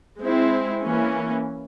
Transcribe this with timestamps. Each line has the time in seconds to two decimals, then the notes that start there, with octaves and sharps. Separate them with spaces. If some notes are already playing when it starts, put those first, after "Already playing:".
0.18 G#3 C4 E4
0.82 E3 A#3 C#4